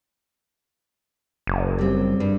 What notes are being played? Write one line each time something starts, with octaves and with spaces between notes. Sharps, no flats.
F#1
G3 C4
G2